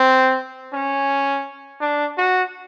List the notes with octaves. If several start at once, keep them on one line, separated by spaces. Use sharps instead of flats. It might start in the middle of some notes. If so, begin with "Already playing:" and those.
Already playing: C4
C#4
D4
F#4